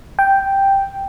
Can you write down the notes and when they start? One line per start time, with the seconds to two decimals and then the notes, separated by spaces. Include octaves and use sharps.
0.19 G5